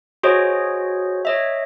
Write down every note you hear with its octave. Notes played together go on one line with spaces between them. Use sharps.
F#4 G#4 C5 C#5 D#5
C#5 D#5 E5